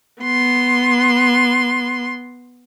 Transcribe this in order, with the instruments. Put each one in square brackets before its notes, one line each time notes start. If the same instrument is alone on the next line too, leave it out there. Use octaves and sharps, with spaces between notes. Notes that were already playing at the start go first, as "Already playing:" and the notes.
[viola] B3 C6